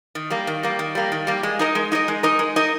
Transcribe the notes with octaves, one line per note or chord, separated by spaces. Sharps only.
D#3
G3 A#3
D#3
G3 A#3
D#3
G3 A#3
D#3
G3 A#3
G#3
D#4 A#4 D#5
G#3
D#4 A#4 D#5
G#3
D#4 A#4 D#5
G#3
D#4 A#4 D#5